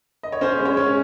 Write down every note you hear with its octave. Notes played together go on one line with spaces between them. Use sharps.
D#5
C#5
C#4 C5
G#3
C#5
C#4